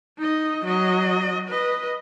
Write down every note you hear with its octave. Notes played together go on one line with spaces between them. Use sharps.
D#4 D#5
F#3 D#5
B4 D#5